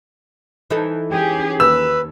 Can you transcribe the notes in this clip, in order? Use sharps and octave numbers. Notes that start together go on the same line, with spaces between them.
E3 D#4 A4
C#4 G4 G#4 G5
D#2 B4 E6